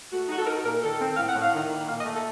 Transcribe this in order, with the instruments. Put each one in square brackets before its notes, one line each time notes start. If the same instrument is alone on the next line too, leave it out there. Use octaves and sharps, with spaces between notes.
[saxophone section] A3 F#4
D#4 F#4
A4
D#4 A#4
A#2 A#4
D#3 A4
C4
A2 F5
F#5
A2
F5
D#3
A#3
A#2 F5
D#5
A3
A4